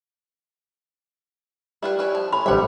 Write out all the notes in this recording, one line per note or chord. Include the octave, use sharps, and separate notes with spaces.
G3 E4 F4 B4
C#4 E4 B4
F3
A2 C#4 B5
A1 D3 G3 C4 E5 F#5